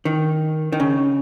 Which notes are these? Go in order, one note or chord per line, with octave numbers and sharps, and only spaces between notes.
D#3
D#3
C#3